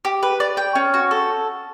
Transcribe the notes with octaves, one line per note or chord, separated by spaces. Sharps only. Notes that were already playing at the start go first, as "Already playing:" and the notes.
G4
B4
D5
G5
C#4
F#4
A4